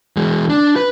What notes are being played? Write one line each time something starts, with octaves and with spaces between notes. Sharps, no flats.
E3 G#3
D4
B4